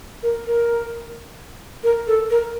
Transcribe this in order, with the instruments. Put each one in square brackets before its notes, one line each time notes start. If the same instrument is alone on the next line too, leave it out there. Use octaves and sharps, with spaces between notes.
[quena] A#4
A#4
A#4
A4
A#4